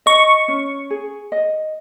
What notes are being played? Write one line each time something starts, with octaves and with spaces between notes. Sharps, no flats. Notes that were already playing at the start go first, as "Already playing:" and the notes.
D#5 C#6
C#4
G#4
D#5